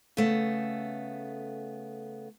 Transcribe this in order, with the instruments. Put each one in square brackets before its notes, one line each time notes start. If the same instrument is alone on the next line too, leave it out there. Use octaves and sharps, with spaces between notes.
[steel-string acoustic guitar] C#3 A3 B3